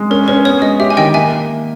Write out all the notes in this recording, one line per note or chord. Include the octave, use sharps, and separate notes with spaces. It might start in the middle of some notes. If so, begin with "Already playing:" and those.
Already playing: G#3
C#4 A#4
C#4 B4
B3 C#5
G#3 D#5
G4 E5
G#5
D#3 D#5 G5
A#3 E5 G#5